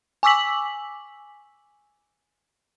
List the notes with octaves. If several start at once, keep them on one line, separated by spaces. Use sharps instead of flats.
G#5 C#6 D6 E6 B6 F#7